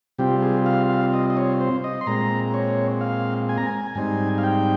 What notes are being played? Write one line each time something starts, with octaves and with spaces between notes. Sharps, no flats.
C3 G3 C4 F4 G4
G#4
F5
F5
D#5
D#5
C#5
C5
D#5
C6
A#2 G#3 C4 A#5
C#5
F5
G#5
A#5
G#5
G#2 G3 C4 D#4 G#5
F5
G5